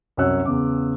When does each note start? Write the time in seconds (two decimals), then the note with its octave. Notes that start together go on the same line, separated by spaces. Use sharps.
0.17 C2 F#2 F#4 C#5 E6 F#6
0.45 E2 C#3 D6